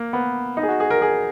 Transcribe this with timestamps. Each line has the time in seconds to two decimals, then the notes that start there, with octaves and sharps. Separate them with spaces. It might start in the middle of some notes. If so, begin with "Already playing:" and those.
Already playing: A#3
0.13 B3
0.57 D#4
0.63 G#4
0.68 F#4
0.80 G#4
0.90 A#4
1.02 G#4